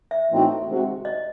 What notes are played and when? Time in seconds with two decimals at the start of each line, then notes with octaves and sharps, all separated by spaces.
0.11 E5
0.30 A2 E3 C4 D#4 F#4
0.68 C3 D#3 G#3 C4 F#4
1.05 D#5